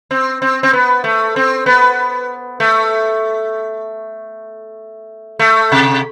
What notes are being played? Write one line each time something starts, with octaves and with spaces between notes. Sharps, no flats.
C4
C4
C4
B3
A3
C4
B3
A3
A3
C3